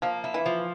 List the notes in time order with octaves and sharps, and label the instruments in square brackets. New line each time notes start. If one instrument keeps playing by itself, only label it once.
[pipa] F3 [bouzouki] A#3
[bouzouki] E4
[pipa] E3
[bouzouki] F3